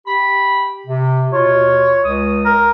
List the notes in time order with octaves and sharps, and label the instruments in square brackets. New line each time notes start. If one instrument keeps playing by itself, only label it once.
[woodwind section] G4 B5
C3
[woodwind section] D#2 B2 F4 [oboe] C#5
[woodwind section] C#2 D#6
[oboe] A#4